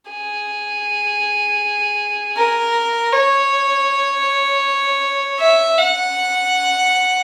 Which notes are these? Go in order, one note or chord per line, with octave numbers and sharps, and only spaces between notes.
G#4
A#4
C#5
E5
F#5